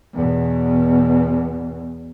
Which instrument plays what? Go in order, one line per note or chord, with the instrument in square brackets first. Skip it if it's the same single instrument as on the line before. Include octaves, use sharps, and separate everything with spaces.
[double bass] E2 B2